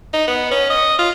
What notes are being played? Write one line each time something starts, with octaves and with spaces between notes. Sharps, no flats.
D#4
B3
C#4
D#5
F4